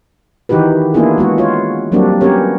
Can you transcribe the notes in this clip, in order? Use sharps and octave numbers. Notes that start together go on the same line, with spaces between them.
D#3 E3 D#4 F#4 G4 B4
A#3 B3 D4 E4 F4 G#4
G#3 B3 F#4
F4 F#4 C#5
F#3 G3 A#3 C4 D4 F#4
B3 C#4 F#4 G4 A#4 C#5